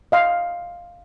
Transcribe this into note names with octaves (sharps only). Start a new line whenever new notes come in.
D#5 F5 C6